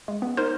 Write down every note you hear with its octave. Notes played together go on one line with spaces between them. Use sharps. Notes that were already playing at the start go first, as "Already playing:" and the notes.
G#3
B3
D#4 A#4 C5